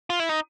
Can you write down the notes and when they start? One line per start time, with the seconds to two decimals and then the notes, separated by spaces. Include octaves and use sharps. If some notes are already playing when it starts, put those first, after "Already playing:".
0.10 F4
0.19 E4
0.29 D#4